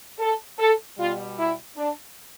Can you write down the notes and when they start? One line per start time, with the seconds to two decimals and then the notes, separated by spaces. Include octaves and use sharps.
0.19 A4
0.59 A4
0.98 B2 G3 F4
1.38 E4
1.77 D4